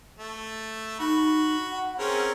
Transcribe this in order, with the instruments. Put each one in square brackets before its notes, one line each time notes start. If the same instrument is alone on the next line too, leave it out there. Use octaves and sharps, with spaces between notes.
[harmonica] A3
[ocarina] D#4 [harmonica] F#4 B5
[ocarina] F#5
[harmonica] C4 C#4 A#4 [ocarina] G#4